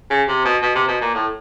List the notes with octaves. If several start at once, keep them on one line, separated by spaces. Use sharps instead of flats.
C#3
C3
B2
B2
C3
B2
A#2
A2